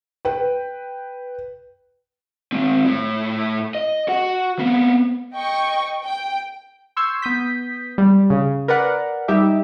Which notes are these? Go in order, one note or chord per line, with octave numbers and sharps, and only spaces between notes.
B4 G5
G#3 C4
A2 E4
D#5
F#4 F#5
A#3 B3
D#5 G5 C#6
G5
C6 C#6 E6 G6 G#6 C7
B3 D#6 G6 B6
G3
C#3
A#4 B4 D5 F#5
G3 D#4 G4 E5